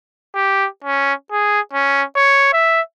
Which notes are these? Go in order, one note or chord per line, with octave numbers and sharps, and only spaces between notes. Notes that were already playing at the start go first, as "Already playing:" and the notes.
G4
C#4
G#4
C#4
C#5
E5